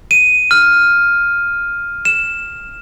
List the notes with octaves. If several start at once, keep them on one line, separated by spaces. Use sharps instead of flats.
D#7
F6
E7